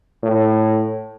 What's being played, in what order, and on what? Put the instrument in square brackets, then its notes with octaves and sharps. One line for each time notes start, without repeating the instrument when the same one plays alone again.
[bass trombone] A2